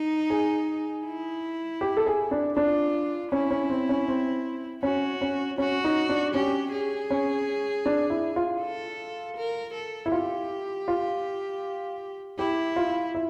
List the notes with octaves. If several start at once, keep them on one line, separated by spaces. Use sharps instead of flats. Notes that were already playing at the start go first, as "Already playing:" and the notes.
Already playing: D#4
G#4
E4
G4
A4
G#4
D4
D4 F4
C#4 E4
C#4
C4
C#4
C4
C#4 F#4
C#4
C#4 F#4
D#4
D4
C#4 G4
G#4
C#4
D4
E4
F4
A4
A#4
A4
E4
F4 G4
F4
E4 G4
F4
E4